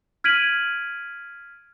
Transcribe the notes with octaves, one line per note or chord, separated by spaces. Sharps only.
F6 G#6 B6 D7 D#7 F#7